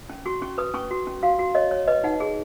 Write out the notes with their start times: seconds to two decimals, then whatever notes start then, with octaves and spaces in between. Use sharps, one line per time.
0.09 C#4
0.26 F#4 C#6
0.42 C#4 C#6
0.58 B4 D#6
0.74 C#4 C#6
0.91 F#4
1.07 C#4
1.23 F#4 F5
1.39 F#4
1.55 C#5 D#5
1.71 C#5
1.88 B4 D#5
2.04 D#4 F#5
2.20 G#4